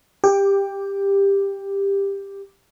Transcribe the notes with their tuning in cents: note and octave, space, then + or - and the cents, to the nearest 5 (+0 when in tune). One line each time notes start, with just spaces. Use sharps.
G4 +15 D6 +0